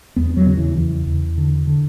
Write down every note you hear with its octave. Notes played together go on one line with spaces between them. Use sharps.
E2 B3
F#3
C#3
E3
E2 E3
E2
D3
D3